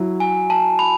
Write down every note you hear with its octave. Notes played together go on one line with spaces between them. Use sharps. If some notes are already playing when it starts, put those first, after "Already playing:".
Already playing: F#3 E4
G#5
A5
B5